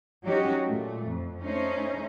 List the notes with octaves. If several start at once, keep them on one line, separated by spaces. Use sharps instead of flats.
F#3 C#4 D#4 F#4 G4
A#2 A3
F2
A3 C#4 D#4 C5